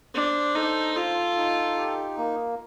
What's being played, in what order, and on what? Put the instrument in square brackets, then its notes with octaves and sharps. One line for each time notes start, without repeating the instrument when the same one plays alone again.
[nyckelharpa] D4 [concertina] C5
[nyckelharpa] D#4 [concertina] A4
[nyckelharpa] F4 [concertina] A4
[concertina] D#4
G4
A#3